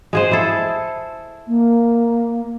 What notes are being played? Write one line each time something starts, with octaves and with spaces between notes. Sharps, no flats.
G#3 G#4 C5
E4 A4
A#3